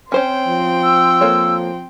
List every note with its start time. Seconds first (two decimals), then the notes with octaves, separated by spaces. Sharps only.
0.12 C4 C#4 C5 C#5 G5 C6
0.48 F3
0.83 E6
1.21 A#3 A4 C#5